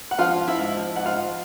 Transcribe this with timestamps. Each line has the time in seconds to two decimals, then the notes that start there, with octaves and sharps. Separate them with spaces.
0.11 F#5
0.19 F3 F4 F5
0.38 F3
0.48 E4 E5
0.58 G#2
0.77 F3
0.96 G#2 F#5
1.06 F4 F5
1.15 F3